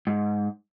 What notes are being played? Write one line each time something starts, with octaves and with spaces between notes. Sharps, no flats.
G#2